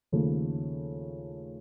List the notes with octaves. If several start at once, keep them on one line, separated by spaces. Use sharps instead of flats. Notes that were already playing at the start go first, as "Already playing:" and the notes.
D#2 C#3 F3 A3